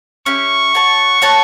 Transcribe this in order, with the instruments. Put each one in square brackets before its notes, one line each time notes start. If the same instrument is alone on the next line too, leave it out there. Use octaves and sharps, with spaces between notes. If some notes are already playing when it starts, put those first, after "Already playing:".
[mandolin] C#4 E4 G4 [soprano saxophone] C#6
[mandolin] F#4 C#5 F#5 A5
F#4 C#5 F#5 A5